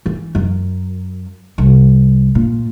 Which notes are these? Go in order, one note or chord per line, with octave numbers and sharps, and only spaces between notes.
E3
F#2
C2
A#2